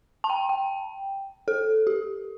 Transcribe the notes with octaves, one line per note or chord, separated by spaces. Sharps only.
A5
G5
G5
A4
G4